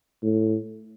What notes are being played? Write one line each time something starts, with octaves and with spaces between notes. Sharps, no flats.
A2